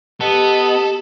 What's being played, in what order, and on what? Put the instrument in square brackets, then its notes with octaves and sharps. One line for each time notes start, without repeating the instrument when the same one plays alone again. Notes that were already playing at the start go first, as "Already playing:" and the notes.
[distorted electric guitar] B3 [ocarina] G4 [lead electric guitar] A4 [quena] D#5